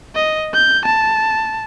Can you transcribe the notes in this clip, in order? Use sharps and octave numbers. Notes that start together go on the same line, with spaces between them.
D#5
G6
A5